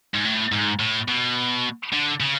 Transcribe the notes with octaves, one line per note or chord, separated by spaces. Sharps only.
G#2
A2
G#2
A2
B2
D3
C#3